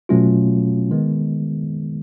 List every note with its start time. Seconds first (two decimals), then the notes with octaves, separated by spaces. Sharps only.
0.09 B2 F#3 A3 C#4 F4
0.91 D#3 G#3 B3